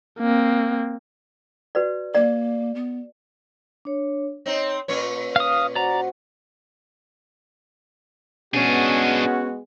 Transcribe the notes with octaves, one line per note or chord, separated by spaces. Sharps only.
A#3 C4
F#4 B4 D5
A#3 D5
B3
D4 C#5
C4 D#4 C#5
A#2 C#4 B4 C#5
F5 D#6
F#4 C5 D5 F#5 A#5
G#3 B3 C#4 D4 F#4 G#4